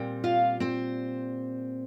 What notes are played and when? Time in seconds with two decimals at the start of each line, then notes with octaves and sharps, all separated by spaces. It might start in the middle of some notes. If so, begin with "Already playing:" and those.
Already playing: A#2 G3 C4
0.24 F4 F5
0.60 C4 C5